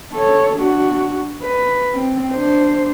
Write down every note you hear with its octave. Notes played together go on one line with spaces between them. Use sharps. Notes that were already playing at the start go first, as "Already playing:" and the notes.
A4 C#5
D4 F#4
B4
C4
D4 C5